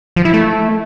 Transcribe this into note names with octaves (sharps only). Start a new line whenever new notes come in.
F3
E4
A3